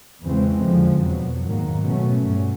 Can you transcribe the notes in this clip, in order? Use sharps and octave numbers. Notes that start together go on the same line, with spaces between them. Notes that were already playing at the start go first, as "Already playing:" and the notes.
E2 C#3 E3 G#3 C4
F2 D3 F3
E2 B2 F#3
G#2 D#3 F#3 A#3
B2 F#3 A3 C#4
G2